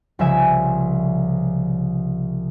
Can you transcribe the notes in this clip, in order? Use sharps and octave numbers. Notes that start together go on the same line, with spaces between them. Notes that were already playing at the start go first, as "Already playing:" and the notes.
C2 C#3 F3 E5 G#5 G#6